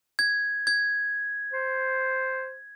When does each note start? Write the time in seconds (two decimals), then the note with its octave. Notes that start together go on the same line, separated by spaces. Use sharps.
0.19 G#6
0.67 G#6
1.53 C5